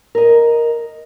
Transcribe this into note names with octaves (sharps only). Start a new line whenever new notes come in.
A#4 D#5